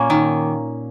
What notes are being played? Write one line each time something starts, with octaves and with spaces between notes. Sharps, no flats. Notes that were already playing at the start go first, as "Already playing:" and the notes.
Already playing: A#2 A#3 C#4
D#3